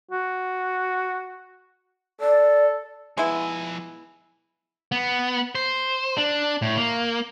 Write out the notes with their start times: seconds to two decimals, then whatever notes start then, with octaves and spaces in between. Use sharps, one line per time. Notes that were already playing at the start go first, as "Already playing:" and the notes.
0.11 F#4
2.21 A4 D5
3.18 F3 G#3 B3 E4 G#5
4.92 B3
5.55 C5
6.18 D4
6.62 A2
6.77 A#3